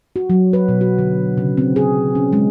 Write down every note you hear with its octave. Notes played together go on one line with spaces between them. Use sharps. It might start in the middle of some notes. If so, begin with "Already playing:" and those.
F#4
F#3
B4
B2
F#4
D3
C#3
C4
G#4
C#4
G#3